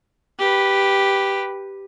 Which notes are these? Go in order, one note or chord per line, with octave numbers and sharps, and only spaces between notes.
G4 B4